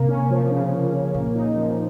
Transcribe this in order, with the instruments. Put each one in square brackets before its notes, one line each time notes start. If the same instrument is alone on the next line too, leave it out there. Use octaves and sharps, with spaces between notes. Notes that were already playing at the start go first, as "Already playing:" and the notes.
Already playing: [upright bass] C3 [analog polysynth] A#3
[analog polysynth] C#4
F3
C#3
A#3
C#4
[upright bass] A#2 [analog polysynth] A#3
[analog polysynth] D#4
F3